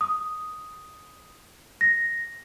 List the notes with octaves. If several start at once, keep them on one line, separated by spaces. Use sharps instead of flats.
D#6
A#6